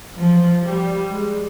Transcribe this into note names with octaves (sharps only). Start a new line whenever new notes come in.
F3
G3
G#3